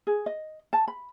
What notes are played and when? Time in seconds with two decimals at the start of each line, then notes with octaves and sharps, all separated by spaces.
0.07 G#4
0.26 D#5
0.73 A5
0.88 B5